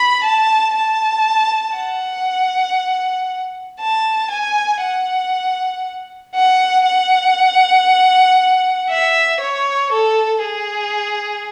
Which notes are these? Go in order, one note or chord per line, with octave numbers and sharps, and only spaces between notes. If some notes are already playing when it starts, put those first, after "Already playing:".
Already playing: B5
A5
A5
F#5
A5
G#5
F#5
F#5
F#5
E5
C#5
A4
G#4